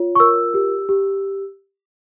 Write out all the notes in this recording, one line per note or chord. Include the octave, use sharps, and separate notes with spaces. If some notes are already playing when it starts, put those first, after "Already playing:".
Already playing: F4 C#5
C#6
A#4 E6
G4
G4